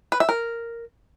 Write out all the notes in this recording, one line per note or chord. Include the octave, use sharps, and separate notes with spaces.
B4
E5
A#4